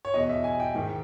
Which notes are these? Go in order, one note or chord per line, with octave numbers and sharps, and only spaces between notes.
C#5
E2 B2 D#5
E5
G#5
G5
G#2 D#3